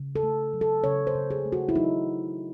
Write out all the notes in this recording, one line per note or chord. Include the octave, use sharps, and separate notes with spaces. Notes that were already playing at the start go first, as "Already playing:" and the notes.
Already playing: C#3
A4
A3
F#3
A4
C#3 C#5
C5
C#3
G#4
A3
F#4
E4
F#3 D#4